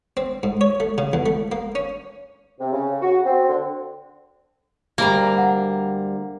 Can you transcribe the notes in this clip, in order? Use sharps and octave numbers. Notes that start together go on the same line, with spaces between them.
C4
G#2
C#5
A3
C#3
E2
A3
A#3
C#4
C3
C#3
F#4
C4
D3
D2 G3 A#3 A#5
F#5